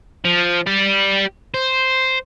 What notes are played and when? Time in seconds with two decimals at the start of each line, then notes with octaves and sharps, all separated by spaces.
0.25 F3
0.67 G4 D5
1.54 C5